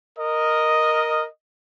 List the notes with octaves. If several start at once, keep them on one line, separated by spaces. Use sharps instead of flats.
A#4 D#5